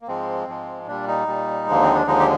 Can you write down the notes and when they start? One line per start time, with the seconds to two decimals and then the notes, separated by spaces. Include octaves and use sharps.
0.02 A#3
0.07 G#2 F3 G#3 C4
0.47 G#2 F3 G#3
0.87 A#2 G3 D4
1.08 D#4
1.27 A#2 G3
1.67 D#2 D3 F3 G#3 A#3
1.83 C4
1.95 D4
2.07 D#2 D3 F3 G#3 D#4
2.19 G4